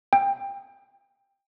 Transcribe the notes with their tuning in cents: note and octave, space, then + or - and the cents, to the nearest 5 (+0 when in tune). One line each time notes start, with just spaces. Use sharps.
G5 +20